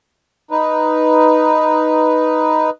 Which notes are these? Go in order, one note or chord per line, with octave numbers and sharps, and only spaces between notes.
D#4 B4